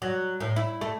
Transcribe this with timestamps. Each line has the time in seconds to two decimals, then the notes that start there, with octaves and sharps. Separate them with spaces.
0.02 F#3
0.40 A2
0.56 E4
0.81 A3